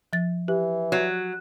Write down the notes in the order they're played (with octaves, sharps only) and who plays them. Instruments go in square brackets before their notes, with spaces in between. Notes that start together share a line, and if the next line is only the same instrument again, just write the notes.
[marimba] F3 A6
[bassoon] E3 [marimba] G4
[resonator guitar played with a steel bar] F#3